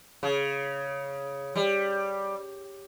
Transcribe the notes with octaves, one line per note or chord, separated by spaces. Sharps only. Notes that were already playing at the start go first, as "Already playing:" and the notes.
C#3
G3